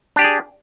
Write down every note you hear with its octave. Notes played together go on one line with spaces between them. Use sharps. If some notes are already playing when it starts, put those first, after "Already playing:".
D4 G4 G#4 D5